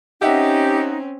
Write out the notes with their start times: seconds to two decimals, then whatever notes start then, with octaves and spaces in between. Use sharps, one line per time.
0.21 C4 C#4 D#4 G4 D#5 E5 F#5